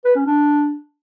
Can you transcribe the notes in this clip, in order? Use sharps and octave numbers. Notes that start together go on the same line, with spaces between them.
B4
C#4
D4